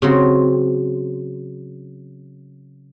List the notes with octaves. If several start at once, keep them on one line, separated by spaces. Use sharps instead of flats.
C#3 F#3 C4